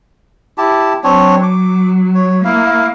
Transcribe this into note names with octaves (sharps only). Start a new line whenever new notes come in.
E4 G4 A5
F#3 C4 D4 C#5
D6
C#5
A#3 E4 F5